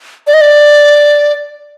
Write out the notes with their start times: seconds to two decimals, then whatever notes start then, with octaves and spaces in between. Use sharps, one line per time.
0.27 D5
0.34 D#5
0.41 D5